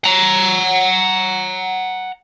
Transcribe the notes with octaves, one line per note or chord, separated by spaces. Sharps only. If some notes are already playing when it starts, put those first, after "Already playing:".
F#5 A#5